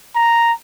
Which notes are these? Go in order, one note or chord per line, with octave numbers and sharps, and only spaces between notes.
A#5